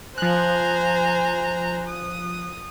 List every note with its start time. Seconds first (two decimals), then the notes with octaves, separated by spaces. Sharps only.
0.18 F3 C5 G#5 A#5 F#6
1.88 D#6